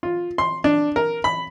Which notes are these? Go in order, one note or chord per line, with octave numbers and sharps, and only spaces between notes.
F4
C6
D4
A#4
B5